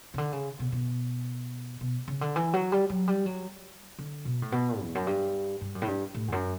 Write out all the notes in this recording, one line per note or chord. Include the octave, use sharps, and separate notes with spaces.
C#3
D3
C#3
B2
B2
B2
C#3
D3
E3
F#3
G3
F#3
G3
F#3
D3
B2
A2
B2
E2
F#2
G2
G2
F#2
A2
G2
A2
E2
F#2